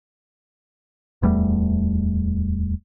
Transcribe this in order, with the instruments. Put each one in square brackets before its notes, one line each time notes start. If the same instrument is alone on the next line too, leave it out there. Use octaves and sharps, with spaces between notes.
[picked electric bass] D1 E2 G3 A3